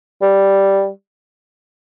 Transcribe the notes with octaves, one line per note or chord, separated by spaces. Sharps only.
G3